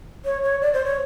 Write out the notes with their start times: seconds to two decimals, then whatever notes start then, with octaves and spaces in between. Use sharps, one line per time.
0.25 C#5
0.43 C#5
0.61 D5
0.74 C5
0.85 C#5